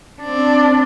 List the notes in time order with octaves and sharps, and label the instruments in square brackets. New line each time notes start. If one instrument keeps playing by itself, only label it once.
[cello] C4 D4